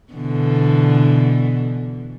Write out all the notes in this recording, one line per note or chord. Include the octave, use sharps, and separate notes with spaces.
B2 D3 E3